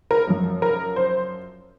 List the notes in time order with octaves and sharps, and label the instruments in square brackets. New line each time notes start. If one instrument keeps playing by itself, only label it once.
[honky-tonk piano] A#4
F#2 F3
A#4
C5